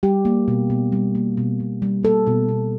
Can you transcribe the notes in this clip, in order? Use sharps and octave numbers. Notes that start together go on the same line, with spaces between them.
G3 G4
A#3
B2
B2
G3
A#3
B2
B2
G3
A#3 A4
B2
B2